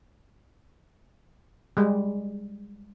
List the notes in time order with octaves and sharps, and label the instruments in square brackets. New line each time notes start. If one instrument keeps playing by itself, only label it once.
[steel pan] G3 G#3